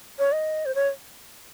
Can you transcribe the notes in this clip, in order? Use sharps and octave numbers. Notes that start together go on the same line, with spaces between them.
C#5
D#5
C5
C#5